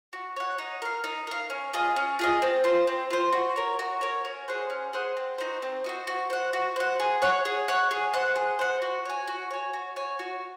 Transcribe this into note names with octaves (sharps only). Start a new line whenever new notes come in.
F#4
C#5 F#5
D#4
A#4 F5
D#4
A#4 F5
C#4
F4 G#4 D#5
C#4
F4 G#4 D#5
C4
F4 C5
C4
F4 C5
F#4
A#4 C#5
F#4
A#4 C#5
C#4
G#4 C5 F#5
C#4
G#4 C5 F#5
C4
D#4 F#4 C5
C4
D#4 F#4 C5
F#4
C5 F#5
F#4
C5 F#5
G#4
C#5 F#5
G#4
C#5 F#5
G#4
C5 F#5
G#4
C5 F#5
F#4
C#5 G#5
F#4
C#5 G#5
F#4
C#5 G#5
F#4